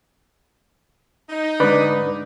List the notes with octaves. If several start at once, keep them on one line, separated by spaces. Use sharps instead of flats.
D#4
G#2 D3 B4 D5 B5